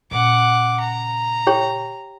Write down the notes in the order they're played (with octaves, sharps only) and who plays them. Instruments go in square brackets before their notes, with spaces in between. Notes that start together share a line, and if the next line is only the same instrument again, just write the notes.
[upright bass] A#2 C#3 [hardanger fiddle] F#5 D6
[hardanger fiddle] A#5
[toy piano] G4 C#5 G5